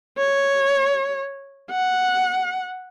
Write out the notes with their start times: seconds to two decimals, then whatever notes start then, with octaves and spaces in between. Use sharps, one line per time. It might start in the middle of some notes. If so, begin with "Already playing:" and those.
0.18 C#5
1.71 F#5